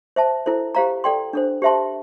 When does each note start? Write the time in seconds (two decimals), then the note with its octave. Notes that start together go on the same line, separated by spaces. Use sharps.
0.16 C5 E5 A5
0.46 E4 A4 C5
0.75 G4 C5 F5 A#5
1.04 A4 D5 G5 C6
1.33 D4 A4 C5
1.62 G4 C5 E5 A5 C6